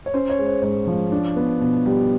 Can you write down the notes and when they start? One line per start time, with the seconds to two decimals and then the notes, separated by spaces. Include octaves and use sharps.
0.06 C#5
0.14 C#4 C5
0.30 C#5
0.39 G#3
0.47 C5
0.62 G#2 C#5
0.87 F3
1.12 D4
1.36 B3
1.61 B2
1.86 G3